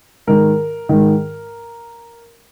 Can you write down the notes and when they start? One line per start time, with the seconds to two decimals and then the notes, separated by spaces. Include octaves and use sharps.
0.27 G#2 D#3 A#4
0.89 G#2 D#3